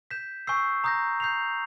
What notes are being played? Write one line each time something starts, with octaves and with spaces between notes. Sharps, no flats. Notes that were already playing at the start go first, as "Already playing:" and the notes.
G6 B6 E7
G#5 C#6 E6 G6 C7
A#5 D#6 G6 A#6
G6 C7 F7